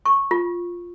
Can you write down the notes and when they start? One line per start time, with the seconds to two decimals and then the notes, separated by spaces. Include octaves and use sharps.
0.06 C#6
0.31 F4